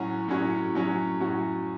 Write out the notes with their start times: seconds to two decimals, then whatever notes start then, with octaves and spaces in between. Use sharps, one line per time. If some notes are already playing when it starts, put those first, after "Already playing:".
Already playing: A2 F#3 C#4 F#4
0.28 A2 F#3 C#4 F#4
0.75 A2 F#3 C#4 F#4
1.20 A2 F#3 C#4 F#4